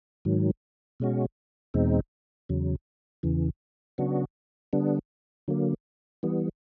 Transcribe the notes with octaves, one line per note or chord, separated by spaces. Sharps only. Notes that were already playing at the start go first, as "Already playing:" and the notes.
G#2 D#3 F#3
B2 G#3 C#4 F#4
E2 B2 G#3 C4 D#4
E2 C#3 F#3
E2 C#3 E3
C#3 F#3 B3 D4 F#4
D3 G3 B3 D4
D3 F#3 A#3
E3 G3 B3